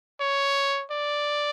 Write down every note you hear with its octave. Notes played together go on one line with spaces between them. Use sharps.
C#5
D5